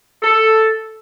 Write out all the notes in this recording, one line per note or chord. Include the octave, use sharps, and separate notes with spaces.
A4